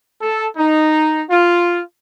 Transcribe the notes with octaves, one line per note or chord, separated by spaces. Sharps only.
A4
D#4
F4